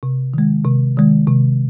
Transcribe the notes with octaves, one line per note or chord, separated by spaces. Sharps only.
C3
D#3 G#3
C3
D#3 G#3
C3